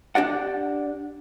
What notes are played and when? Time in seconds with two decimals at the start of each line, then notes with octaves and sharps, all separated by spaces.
0.15 D4 G4 D5 F#5